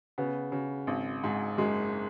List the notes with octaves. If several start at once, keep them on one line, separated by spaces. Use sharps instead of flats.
C#3 B3
C#3
G#1
G#2
F#1 G#3